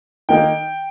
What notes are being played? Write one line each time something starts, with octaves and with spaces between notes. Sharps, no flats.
D#3 A#3 D#4 G5